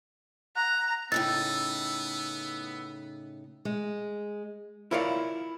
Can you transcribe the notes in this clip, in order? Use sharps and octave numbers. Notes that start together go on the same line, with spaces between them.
F#5 A#5
A2 C#3 B3 D#4 E6 A6
G#3
E4 F4 A#4 C#5 D5 F5